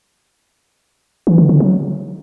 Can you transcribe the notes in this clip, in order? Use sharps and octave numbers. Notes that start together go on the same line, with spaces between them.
E3
D3
D3
F#3